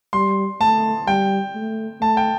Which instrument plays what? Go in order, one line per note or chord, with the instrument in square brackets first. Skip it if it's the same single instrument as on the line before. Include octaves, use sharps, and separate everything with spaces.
[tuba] G3 [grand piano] C6
[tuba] A3 [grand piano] A5
[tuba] G3 [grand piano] G5
[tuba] A3
[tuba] A3 [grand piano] A5
[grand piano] G5